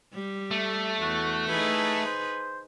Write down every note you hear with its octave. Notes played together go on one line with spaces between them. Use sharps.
G3
A3
E2 F#4
D#4 E4 G#4 B4
C5